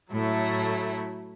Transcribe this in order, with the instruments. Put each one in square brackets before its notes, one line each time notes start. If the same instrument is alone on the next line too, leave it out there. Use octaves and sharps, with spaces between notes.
[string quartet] A2 F#3 A3 E4